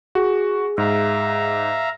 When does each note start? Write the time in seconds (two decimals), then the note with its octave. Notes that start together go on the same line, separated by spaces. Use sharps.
0.15 F#4 G#4
0.78 G#2 E5 F5 A#5